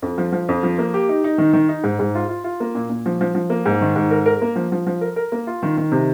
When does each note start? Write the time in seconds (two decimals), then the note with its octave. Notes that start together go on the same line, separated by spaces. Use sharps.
0.02 F2
0.18 F3
0.32 F3
0.49 F2
0.63 F3
0.79 A#3
0.94 G4
1.09 D#4
1.24 D#4
1.38 D#3
1.53 D#3
1.69 D#4
1.84 G#2
1.99 G#2
2.15 F4
2.29 F4
2.44 F4
2.60 A#3
2.75 A#2
2.90 A#2
3.06 F3
3.21 F3
3.35 F3
3.50 A#3
3.66 G#2
3.81 D#3
3.96 G#2
4.11 A#4
4.26 A#4
4.42 A#3
4.56 F3
4.72 F3
4.87 F3
5.01 A#4
5.16 A#4
5.32 A#3
5.47 F4
5.63 D#3
5.77 D#3
5.92 C3